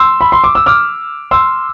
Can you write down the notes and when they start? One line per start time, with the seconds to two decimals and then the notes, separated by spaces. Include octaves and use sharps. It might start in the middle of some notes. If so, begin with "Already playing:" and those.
Already playing: C6 E6
0.21 B5
0.32 C6
0.44 D6
0.55 E6
0.66 D6 F6
1.31 C6 E6